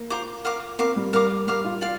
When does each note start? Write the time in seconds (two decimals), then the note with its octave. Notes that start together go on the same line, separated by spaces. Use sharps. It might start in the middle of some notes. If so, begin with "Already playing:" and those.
Already playing: A#3
0.10 F4 C5 A#5 D6
0.45 A#4 F5 D6
0.79 C4 A#4 F5 D6
0.96 G3
1.13 G3 A#4 F5 D6
1.47 G3 A#4 F5 D6
1.65 F4
1.81 F4 D5 F5